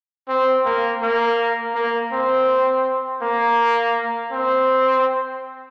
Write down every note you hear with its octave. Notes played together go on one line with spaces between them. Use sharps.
C4
A#3
A#3
A#3
C4
A#3
C4